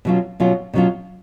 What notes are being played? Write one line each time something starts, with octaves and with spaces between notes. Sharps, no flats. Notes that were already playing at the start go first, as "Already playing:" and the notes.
B2 F#3 C#4 F4
B2 F#3 C#4 F4
B2 F#3 C#4 F4